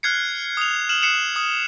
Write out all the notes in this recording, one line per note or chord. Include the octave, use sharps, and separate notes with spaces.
F6 F#6 G#6 C7 C#7
D#6 F7
F6 E7 F#7
F#6 C7 C#7 E7 F7
D#6